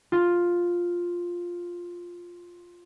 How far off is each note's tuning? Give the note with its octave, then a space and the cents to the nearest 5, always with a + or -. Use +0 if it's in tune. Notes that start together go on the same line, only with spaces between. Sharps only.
F4 +5